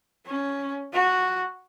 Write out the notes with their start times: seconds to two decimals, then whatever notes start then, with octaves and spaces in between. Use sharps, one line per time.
0.26 C#4
0.93 F#4